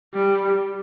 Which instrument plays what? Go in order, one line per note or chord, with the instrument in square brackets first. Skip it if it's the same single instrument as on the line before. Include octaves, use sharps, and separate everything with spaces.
[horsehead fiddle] G3